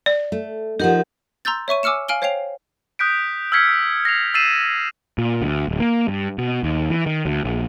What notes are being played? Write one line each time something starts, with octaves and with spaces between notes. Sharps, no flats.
D5
A3
F3 D#4 G4 A#4 F#5
A#5 C6 E6 G6 A6
C#5 E5 C#6 D#7
G#5 D6 E6 F6 C#7 E7
F5 G#5 F6 D7 F#7 G7
C5 C#5 F5 G5 C7 F7
D#6 F#6 G6 B6 D7
E6 F6 G#6 B6 C#7
A#6 C7 F7
E6 A6 C7 D#7 E7
A#2
D2
D1
A#3
G2
B2
D#2
E3
D#3
D2
A#1